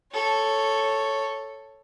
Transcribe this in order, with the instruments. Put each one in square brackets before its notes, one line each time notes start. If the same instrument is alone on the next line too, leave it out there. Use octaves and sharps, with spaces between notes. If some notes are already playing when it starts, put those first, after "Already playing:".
[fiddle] A4 C#5